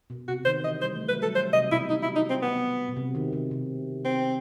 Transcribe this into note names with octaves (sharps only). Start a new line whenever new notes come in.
B2
C3 F#4
D#3 C5
E3 D#5
G3 C5
A3
F#3 B4
G3 A4
F#3 C5
C3 D#5
B2 E4
B2 D#4
E4
D#4
C4
B3
B2
C3
D#3
C3
C3
C4